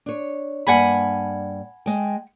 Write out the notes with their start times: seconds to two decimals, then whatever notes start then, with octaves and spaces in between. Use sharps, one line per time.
0.06 D4 C#5
0.67 G2 A#3 D4 F#5 G#5 B5
1.86 G#3 G5